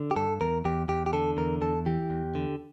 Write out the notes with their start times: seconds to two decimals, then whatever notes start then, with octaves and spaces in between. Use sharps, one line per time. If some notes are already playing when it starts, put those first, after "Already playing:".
Already playing: D3
0.11 G4
0.16 G2 A4
0.41 E2 A#4
0.65 E2 G4
0.88 E2 G4
1.06 G4
1.13 D3 A4
1.37 E2 A#4
1.61 E2 A4
1.86 E3 G4
2.10 E2
2.35 D3